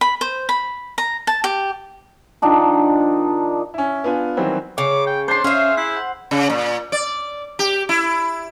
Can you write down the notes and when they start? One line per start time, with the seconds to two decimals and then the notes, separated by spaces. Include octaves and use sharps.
0.01 B5
0.21 C5
0.49 B5
0.98 A#5
1.27 A5
1.44 G4
2.42 D#3 F3 D4 D#4
3.74 C#4 E4
4.04 B3 D4 F4 G#5
4.37 D#3 E3 F#3 G3 C4 F#4
4.78 C#3 C#5 D6
5.07 G5
5.28 D4 C5 C6
5.44 C#4 G#4 E5 F5
5.77 E4 F#6
5.97 F#5
6.31 C#3
6.50 A#2
6.92 D5
7.59 G4
7.89 E4